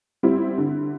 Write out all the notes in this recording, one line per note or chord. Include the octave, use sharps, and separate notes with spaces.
G3 C4 E4
D3